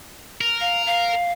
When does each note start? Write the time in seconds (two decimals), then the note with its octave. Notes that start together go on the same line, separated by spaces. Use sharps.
0.41 A#4
0.61 F5
0.86 F5